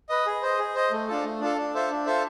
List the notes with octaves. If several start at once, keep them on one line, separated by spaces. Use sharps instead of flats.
B4 D#5
G#4
C5 D#5
G#4
C5 D#5
A3
D4 F4 A4
A3
D4 F4 A4
D4
F4 A4 C5 E5
D4
F4 A4 C5 E5